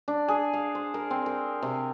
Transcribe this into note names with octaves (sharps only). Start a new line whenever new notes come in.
D4
G#4
F5
C5
A#4
C4
A#4
C3